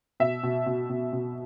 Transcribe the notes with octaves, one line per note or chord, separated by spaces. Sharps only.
B2 E5
B2
B2
B2
B2